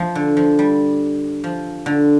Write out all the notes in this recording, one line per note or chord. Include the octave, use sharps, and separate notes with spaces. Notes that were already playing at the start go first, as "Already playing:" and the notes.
Already playing: F3
D3
F3
G3
F3
D3